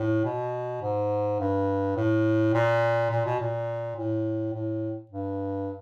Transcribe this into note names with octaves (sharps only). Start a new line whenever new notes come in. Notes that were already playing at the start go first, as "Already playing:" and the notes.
Already playing: A2
B2
G#2
G2
A2
A#2
A#2
B2
A#2
A2
A2
G2